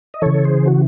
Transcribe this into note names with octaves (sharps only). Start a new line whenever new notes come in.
D#5
C#3 E3 A4 C#5
A4
G#4 C5
F#4